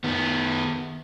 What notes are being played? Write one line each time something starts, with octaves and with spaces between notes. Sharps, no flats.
D#3 B3